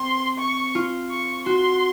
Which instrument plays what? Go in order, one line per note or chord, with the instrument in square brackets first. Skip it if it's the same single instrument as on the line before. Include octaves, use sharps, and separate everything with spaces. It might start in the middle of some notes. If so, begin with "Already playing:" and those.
Already playing: [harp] C4 [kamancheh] C6
[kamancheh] C#6
[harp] F4
[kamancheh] C#6
[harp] F#4 [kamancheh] C6